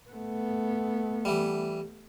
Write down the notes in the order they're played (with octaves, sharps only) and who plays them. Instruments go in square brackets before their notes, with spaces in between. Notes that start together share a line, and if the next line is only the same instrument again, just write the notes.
[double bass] A3 B3
[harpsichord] E3 G3